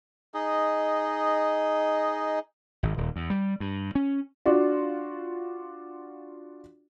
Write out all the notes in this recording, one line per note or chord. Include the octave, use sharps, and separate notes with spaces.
D#4 G#4 D#5
G#1
D#1
E2
G3
G2
C#4
D4 F4 F#4